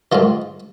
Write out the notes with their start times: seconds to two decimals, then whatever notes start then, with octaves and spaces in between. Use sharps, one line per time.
0.12 G#2 D#3 F4